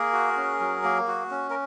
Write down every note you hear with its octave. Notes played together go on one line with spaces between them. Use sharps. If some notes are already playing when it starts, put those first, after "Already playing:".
Already playing: A#3 G#4 A#4
F#4
C#4
F#3
A#3
F#4
C#4
A#4